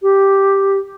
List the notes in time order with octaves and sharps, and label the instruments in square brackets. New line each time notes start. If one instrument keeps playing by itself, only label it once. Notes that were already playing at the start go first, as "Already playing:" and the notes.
[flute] G4